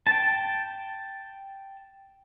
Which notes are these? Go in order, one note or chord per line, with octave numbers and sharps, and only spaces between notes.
G5 A5